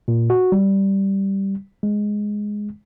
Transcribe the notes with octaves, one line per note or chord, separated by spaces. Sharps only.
A#2
F#4
G3
G#3